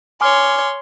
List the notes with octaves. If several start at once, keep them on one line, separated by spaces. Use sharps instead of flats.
C#5 G#5 C6 D6 F6